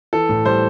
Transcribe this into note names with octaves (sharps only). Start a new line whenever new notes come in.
E3 A4
A2
G3 C5